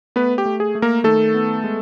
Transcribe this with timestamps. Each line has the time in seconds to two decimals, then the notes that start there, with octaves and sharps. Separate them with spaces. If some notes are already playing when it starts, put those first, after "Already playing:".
0.16 A3 B3 B4
0.38 G4
0.46 A3
0.60 G#4
0.75 A3
0.82 A#3 A#4
1.04 D#3 A3 A4
1.34 B3
1.64 G#3